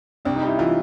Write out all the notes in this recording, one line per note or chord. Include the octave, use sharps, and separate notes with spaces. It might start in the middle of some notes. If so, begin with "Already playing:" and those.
C2 D4
D#4
G3
E4
E3 F4